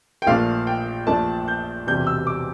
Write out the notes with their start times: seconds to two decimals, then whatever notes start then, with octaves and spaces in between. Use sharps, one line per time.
0.22 G5
0.27 A#1 A#2 A3 D4 F5
0.67 G5
1.07 A#1 A#2 A3 D4 A5
1.48 G6
1.87 E1 E2 C3 G3 G6
2.07 E6
2.27 D6